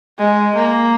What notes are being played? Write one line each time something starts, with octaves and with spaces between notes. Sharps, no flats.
G#3
A#3